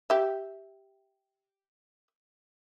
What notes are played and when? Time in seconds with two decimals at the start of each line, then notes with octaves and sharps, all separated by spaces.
0.10 G4 E5